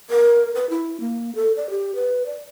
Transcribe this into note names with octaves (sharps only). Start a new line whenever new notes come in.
A#4
B4
E4
A#3
A4
D5
G4
B4
D5